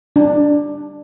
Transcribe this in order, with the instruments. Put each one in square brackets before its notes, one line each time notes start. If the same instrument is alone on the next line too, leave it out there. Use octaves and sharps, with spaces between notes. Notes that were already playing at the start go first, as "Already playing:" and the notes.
[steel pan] D4